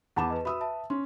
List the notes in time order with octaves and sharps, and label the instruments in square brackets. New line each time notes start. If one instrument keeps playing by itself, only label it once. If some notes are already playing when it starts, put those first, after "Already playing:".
[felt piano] E2 A5 E7 [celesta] F#5 B5 D6
[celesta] B4 D#5
[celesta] F#4 E5 B5 [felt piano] B4 D#6 E6
[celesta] E5 A5
[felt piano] C#4 [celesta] C6